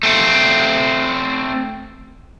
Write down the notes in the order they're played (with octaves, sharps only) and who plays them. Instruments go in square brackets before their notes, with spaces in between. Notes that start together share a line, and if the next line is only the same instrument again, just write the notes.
[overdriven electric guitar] A3 C4